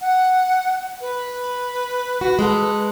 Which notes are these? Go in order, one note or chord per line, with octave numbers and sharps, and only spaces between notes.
F#5
B4
F#4
G#3 A4